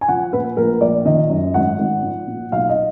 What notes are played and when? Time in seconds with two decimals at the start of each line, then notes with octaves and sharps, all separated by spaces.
0.01 G#5
0.08 F3 F#5
0.33 A#2 B4
0.57 A#1 A#4
0.81 A#1 D5
1.05 D#3 D#5
1.30 F#2
1.54 G#1 F#5
1.79 G#1
2.03 F3
2.27 A#2
2.52 B1 F5
2.69 D#5